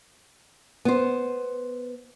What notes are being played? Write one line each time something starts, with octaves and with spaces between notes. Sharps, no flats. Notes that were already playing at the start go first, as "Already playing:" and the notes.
B3 C5